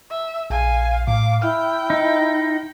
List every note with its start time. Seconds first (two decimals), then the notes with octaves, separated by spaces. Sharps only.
0.10 E5
0.50 A#1 F5 G#5
1.08 A2 D6
1.42 E4 G5 F6
1.90 D#4